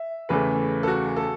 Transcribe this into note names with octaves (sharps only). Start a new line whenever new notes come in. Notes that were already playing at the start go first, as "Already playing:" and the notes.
Already playing: E5
E2 C#3 E3 A3 B4
A4
F#4
A4